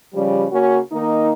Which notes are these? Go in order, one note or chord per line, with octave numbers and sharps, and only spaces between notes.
C#3 F3 G3
C#3 A#3 C#4 F#4
D#3 A#3 D#4